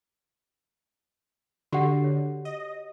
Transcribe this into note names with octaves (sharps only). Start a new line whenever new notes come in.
D3 F#4 G4 F#5
C#5
D#5